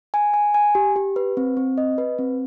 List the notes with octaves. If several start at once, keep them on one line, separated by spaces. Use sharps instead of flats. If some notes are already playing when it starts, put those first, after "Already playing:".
G#5
G#5
G#5
G4
G4
B4
C4
C4
D#5
B4
C4